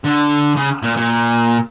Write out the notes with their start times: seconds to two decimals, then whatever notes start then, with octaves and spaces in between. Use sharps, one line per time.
0.04 D3
0.56 C#3
0.82 A#2
0.97 A#2